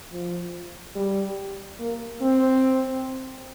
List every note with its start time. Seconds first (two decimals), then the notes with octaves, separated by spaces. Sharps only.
0.12 F3
0.95 G3
1.80 A#3
2.21 C4